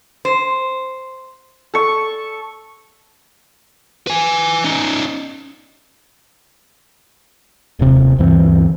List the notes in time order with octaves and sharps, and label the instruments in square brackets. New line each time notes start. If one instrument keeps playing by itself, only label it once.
[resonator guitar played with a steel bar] C5
[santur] A4 C#6
[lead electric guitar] B4 G#5
C#4 D#4
[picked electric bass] D#1 C3
D2 G2 E3 C4